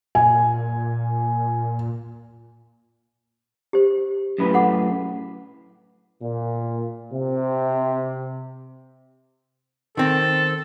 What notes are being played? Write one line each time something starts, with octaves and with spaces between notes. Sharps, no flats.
A#2 G#5
G4 C5
F#2 A2 B4
A4 F#5 D6
A#2
C3
D#3 C4 A4